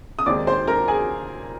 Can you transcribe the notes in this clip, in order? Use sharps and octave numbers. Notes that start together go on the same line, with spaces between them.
D#6
D#2 D#3 G#3 C4 D#4 D5 D6
C5 C6
A#4 A#5
G#4 G#5